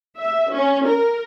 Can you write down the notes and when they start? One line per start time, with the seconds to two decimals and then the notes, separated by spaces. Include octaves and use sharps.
0.18 E5
0.53 C#4
0.86 A#4